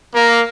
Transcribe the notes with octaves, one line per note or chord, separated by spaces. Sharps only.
A#3